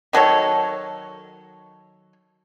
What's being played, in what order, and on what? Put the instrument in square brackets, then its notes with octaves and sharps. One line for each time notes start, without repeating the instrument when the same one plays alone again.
[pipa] D#3 F#3 A4 C#5